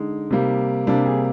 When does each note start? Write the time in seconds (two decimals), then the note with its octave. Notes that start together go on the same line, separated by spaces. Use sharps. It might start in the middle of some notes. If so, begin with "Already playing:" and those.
Already playing: D3 G#3 D#4
0.31 C3 G3 A#3
0.87 C3 G3 A#3 D4
1.06 G#4